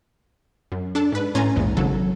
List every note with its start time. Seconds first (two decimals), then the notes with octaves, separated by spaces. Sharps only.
0.72 F#2
0.95 D4 A4 A5
1.12 G#2 B4
1.35 A2 C#4 G#5 A#5 C6 A6
1.56 A#1 E2 G#2
1.77 G#1 C#3 F#3 A4